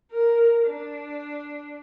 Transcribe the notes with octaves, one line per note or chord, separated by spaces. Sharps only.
A#4
D4